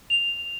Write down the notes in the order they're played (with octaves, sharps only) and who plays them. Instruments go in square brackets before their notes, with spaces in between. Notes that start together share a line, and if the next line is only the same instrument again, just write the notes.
[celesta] F7